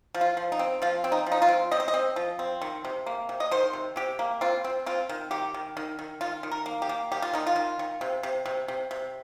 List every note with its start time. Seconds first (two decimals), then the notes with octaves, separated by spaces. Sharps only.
0.14 F3
0.21 F4
0.37 F3
0.52 D#4
0.59 C4
0.82 F3 F4
1.04 C4
1.12 D#4
1.26 F3
1.32 D#4
1.42 F4
1.48 C4
1.71 C4 D#5
1.80 C5
1.88 D#5
1.94 C4
2.16 F3
2.39 C4
2.61 D#3
2.85 C3
3.06 A#3
3.29 C3
3.40 D#5
3.51 D#3 C5
3.73 C3
3.96 C3 G4
4.19 A#3
4.41 C4 F4
4.64 C4
4.86 C4 F4
5.09 D#3
5.31 D#3 G4
5.54 D#3
5.77 D#3
5.99 D#3
6.21 D#3 F4
6.43 D#3
6.51 A#4
6.66 A#3
6.82 G4
6.89 A#3
7.12 D#3 G4
7.22 F4
7.33 D#3 D#4
7.47 F4
7.56 D#3
7.79 D#3
8.01 C3
8.23 C3
8.46 C3
8.68 C3
8.91 C3